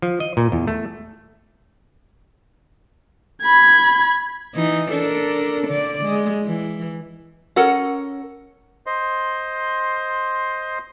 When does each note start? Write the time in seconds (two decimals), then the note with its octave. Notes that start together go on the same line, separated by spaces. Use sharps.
0.02 F3
0.20 D#5
0.37 A#2
0.52 E2
0.67 A3
3.43 B5 G#6
4.54 E3 D#4
4.91 D4 A4 A#4
5.67 D3 D5
6.04 G#3
6.45 E3
7.56 C#4 A4 A#4 F#5
8.86 C5 D#5 C6